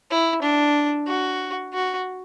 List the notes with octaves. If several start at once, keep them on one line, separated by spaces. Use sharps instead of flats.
E4
D4
F#4
F#4